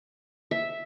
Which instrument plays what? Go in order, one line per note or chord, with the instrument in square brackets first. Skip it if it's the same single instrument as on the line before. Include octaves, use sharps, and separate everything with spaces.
[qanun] E5